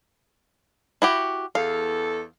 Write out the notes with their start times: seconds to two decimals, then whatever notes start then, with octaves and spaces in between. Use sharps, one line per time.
1.02 E4 F#4 G4
1.55 E2 A4 F5